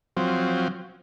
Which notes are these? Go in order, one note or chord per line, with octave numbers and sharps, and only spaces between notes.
F3 F#3 C4